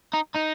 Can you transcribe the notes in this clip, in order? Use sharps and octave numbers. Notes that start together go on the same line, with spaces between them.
D#4
D#4